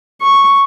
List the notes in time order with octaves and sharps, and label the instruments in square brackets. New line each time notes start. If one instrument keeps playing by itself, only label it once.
[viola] C#6